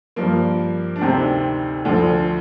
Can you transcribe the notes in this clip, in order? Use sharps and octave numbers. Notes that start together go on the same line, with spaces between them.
G2 F3 A#3
D4
D2 C3 D#3 C4
D2 D3 F3